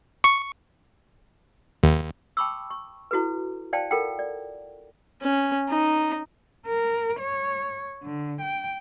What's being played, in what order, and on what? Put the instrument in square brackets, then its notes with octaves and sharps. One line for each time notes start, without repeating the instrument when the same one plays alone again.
[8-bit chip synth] C#6
D#2
[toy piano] G5 A5 B5 C#6 D6 E6
C#6
E4 F#4 A4 B4
C5 D5 F5 G5 A5
F4 A4 A#4 F#5 G5
D5
[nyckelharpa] C#4
D#4
[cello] A#4
C#5
D3
G5